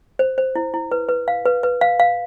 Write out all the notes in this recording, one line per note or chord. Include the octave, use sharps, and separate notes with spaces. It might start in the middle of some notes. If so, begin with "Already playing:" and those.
C5
C5
E4
E4
B4
B4
F5
B4
B4
F5
F5